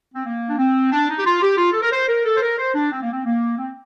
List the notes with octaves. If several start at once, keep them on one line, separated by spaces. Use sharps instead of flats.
C4
A#3
D4
C4
D4
D#4
G4
F4
G4
F4
A4
A#4
C5
A#4
A4
C5
A#4
C5
D4
C4
A#3
C4
A#3
C4